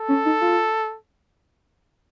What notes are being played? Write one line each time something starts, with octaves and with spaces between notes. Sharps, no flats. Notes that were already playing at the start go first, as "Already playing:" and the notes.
Already playing: A4
C#4
D#4
F4